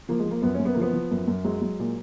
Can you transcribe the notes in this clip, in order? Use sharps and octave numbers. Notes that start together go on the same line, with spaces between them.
F3 A#3
G#3
F3
A#3
F#2 B3
C#4
F#2
B3
A#3
F3 B3
F3
F#2
F#2
F#3 G#3
F#3
A#2